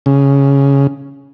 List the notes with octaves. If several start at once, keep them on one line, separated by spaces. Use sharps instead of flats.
C#3